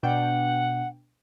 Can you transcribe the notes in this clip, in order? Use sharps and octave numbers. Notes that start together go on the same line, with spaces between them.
B2 D4 F#5 G5